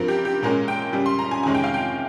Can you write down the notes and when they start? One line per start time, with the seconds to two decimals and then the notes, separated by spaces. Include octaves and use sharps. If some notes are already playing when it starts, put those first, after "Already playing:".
Already playing: G2 F3 C4 A#4
0.08 G4
0.25 G4
0.42 A#2 G#3 C#4 A#4
0.68 G5
0.93 C#3 G3 C#4
1.06 C6
1.19 A#5
1.31 G#5
1.43 F2 C3 D#3 G#3 C#4 G#5
1.55 G5
1.64 F5
1.74 G5